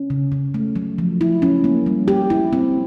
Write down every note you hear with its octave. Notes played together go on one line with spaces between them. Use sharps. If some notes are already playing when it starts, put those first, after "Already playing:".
Already playing: C#4
C#3
C#3
A3
F#3
F3
E4
C#4
A#3
G3
G4
E4
C4